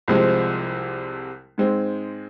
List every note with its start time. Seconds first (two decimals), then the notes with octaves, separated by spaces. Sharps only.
0.08 C2 C3 F3 G#3 C4
1.58 G#2 G#3 C4